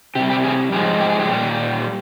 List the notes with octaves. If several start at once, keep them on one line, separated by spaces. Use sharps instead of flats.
C3 G3 G4
G4
G#4
G#2 F3 G#3 G4
G4
G#4
G4
A#2 G3